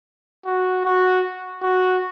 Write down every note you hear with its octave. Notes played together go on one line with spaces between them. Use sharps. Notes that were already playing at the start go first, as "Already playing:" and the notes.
F#4
F#4
F#4